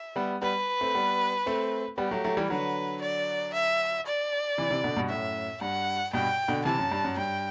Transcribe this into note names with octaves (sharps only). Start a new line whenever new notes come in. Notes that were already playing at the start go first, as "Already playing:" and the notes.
Already playing: E5
G3 B3
G3 B3 B4
A3 C4
G3 B3
A3 C4
G3 B3 G4
F#3 A3
F#3 A3
E3 G3
D3 F#3 B4
D5
E5
D5
C3 E3
C3 E3
B2 D3
G2 B2
F#2 A2 E5
G2 F#5
G2 B2 G5
B2 D3
C3 E3 A5
F#2
G2
F#2
G2 G5